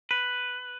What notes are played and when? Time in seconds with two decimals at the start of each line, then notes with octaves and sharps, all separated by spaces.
0.11 B4